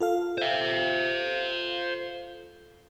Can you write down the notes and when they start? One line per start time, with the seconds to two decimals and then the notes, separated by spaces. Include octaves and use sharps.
0.01 F4 A4 F5
0.38 C5 E5